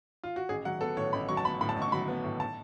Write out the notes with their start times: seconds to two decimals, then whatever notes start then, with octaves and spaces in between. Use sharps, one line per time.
0.23 F4
0.36 F#4
0.49 A1 G#4
0.65 F#3 F#5
0.81 B3 A4
0.97 A2 C#5
1.13 A1 B5
1.29 F#3 C#6
1.37 A5
1.44 B3 B5
1.61 A2 B5
1.69 A5
1.76 A1
1.82 C#6
1.92 F#3 B5
2.08 B3
2.24 A2
2.40 A5